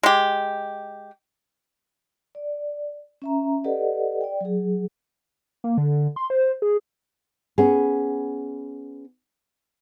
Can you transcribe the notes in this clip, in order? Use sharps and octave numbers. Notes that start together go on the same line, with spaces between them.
G#3 G4
D5
C#4 E5 A#5
G4 A4 B4 D5 D#5 F#5
D5 G5
F#3 G#4
A#3
D3
C6
C5
G#4
B3 C#4 G#4